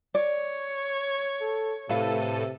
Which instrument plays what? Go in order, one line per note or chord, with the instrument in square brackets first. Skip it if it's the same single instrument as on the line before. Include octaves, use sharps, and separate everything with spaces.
[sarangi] C#5 [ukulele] D5
[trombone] A4
[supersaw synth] A2 A4 D#7 [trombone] C3 [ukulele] B4 F5